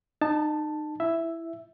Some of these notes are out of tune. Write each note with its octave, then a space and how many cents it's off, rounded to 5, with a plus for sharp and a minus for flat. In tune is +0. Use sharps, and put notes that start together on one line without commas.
D#4 -30 A5 +0
E4 +5 E5 +0